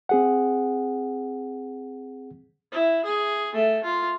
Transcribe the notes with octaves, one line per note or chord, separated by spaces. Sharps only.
C4 G#4 F#5
E4
G#4
A3
F4